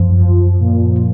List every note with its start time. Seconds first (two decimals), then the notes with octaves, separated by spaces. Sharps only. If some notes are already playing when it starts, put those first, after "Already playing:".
Already playing: F#2 F3
0.17 F3
0.60 A#2